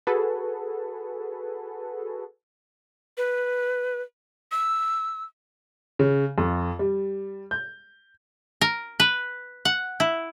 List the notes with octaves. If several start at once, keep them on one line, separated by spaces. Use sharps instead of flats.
F#4 G#4 A4 B4
B4
E6
C#3
F2
G3
G6
A#4
B4
F#5
E4